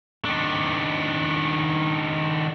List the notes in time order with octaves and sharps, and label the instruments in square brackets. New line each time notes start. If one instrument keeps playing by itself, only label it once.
[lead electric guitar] D#3 D4